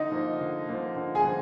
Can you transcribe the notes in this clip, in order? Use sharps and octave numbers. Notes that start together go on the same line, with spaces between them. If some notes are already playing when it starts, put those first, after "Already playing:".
Already playing: D3 D#4 D#5
F3 A#3
D3
F3 A#3
D3
G#4 G#5
F3